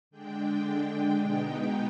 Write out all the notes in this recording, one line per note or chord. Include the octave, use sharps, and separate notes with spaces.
D3 G#3 D4 G5
B2 G#3 B3 D#4